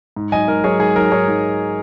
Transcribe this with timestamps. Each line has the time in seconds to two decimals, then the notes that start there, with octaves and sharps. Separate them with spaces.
0.16 G#2
0.32 F#3 D#4 D#5 G#5
0.48 G#2 A#4 D#5
0.64 F#3 D#4 G#4 C#5
0.80 G#2 G#4
0.96 F#3 D#4 A#4
1.11 G#2 G#4 C#5
1.28 F#3 D#4